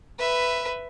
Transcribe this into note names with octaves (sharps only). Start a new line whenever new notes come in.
B4 E5